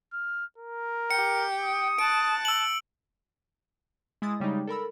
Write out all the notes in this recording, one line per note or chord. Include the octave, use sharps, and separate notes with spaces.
F6
A#4
G4 G5 C#7
D#6
A5 F#6 D7
E6 F#7
G#3 E4 D#6 A6
C#3 G3 G#3 D#4
A4 A#4 B5 E6